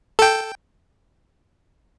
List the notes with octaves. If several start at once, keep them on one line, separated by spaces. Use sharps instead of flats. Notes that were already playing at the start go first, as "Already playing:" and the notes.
A4 G5